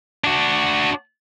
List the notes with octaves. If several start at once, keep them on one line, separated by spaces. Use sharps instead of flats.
D4 F#4